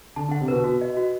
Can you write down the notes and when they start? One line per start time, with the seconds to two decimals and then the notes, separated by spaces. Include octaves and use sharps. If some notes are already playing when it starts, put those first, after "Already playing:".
0.16 D3 A5
0.29 D3 F#5
0.41 C3
0.48 B2 B4
0.64 F#4
0.81 D#5
0.97 F#4